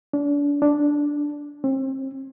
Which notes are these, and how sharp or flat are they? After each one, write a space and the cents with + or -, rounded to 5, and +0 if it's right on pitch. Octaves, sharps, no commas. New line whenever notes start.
D4 -35
D4 -5
C4 +35